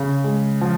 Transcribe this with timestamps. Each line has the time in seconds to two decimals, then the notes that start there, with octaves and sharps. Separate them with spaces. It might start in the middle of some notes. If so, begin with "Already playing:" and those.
Already playing: C#3
0.24 G#3
0.61 F3